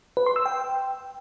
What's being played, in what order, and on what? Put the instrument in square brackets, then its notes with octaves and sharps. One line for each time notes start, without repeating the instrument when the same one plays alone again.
[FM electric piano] B4
C6
E6
G5